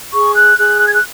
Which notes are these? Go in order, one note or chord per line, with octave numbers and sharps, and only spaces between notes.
G#4 C#6
F#6
G#4 F#6
F#6
G#6
F#6